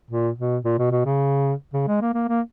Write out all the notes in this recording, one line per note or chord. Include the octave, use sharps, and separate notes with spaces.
A#2
B2
A#2
B2
B2
C#3
C#3
G#3
A#3
A#3
A#3